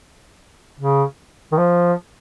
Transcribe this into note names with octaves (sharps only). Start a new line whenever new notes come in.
C#3
D#3
F3